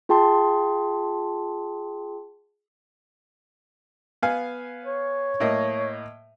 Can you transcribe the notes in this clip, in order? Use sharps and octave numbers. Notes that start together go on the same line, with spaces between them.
F4 G#4 G5 A5 C6
B3 F5 G#5
C#5
A2 A#3 D#5